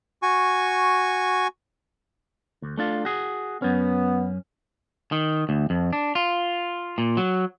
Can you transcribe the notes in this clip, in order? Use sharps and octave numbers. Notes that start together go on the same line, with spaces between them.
F#4 G#5 C#6
D2
A3 D4 F4
F#4 G#4
F#2 B3 C#4
D#3
D2
F2
D4
F4
A#2
F#3